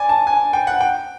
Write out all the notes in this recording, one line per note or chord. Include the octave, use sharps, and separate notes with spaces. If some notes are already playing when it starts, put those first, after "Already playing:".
Already playing: D5 G#5
A5
G#5
G5
F#5
G5